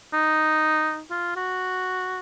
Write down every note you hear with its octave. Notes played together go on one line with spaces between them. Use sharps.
D#4
F4
F#4